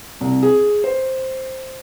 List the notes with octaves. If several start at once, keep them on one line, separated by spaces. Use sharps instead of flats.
C2
G#4
C5